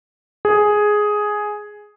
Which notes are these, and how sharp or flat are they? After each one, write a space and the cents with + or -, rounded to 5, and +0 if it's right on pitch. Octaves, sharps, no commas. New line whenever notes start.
G#4 +5